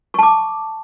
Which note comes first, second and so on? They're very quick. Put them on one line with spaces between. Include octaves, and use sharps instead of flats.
C#6 A5 D6